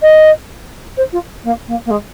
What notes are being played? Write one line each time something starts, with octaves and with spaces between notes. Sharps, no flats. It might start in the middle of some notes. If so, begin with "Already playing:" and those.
D#5
C5
F4
A#3
A#3
A#3
G#3